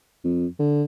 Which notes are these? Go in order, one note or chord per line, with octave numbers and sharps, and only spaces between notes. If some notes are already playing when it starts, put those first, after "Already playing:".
F2
D3